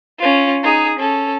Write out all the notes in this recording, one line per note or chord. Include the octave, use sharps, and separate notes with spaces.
C#4 F4
D#4 G#4
C#4 A4